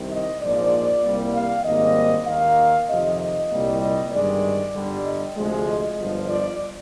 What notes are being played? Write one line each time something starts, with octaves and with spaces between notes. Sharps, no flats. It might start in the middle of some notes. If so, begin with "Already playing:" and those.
Already playing: C2 C3 D#3
D#5
A#1 G#2 F3 A#3 D5
C2 C3 G3 A#3
F5
G#1 G#2 G3 A#3 D#5
D#2 D#3 A#3 F5
F2 C3 D#3 D#5
D#5
C2 A#2 G3 A#3
D#5
G1 G2 D#3 G#3 D5
G1 G2 D3 G3
D#5
D2 C3 F3 G#3
D#5
G1 G2 F3
D5